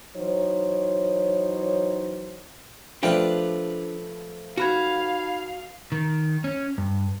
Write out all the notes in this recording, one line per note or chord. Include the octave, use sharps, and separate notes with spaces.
E3 F#3 D#4 C5 C#5
F3 A3 D4 F4 B4 G5
D#4 F#4 F5 B5 G#6
D#3
C#4
G2